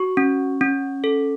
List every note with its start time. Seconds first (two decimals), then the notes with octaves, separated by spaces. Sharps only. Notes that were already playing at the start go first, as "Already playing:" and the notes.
Already playing: F#4 C#6
0.17 C#4
0.61 C#4
1.04 A4